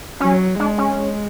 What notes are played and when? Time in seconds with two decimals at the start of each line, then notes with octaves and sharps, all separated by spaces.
0.20 F#3 C#4
0.59 G#3 D4
0.78 C#4
0.97 G#3